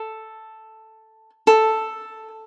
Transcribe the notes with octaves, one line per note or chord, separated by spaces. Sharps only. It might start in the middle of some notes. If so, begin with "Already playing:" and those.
Already playing: A4
A4